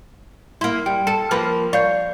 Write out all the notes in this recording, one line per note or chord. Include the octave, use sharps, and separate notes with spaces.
A#3 E4 C6
G3 G5
A4 A5
F3 A#3 B4
C#5 D5 F5 G6